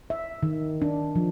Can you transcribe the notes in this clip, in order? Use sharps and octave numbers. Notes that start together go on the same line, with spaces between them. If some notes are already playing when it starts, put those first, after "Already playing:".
E5
D#3
D4
F3